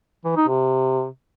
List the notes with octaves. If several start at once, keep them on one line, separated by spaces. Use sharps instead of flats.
E3
D#4
C3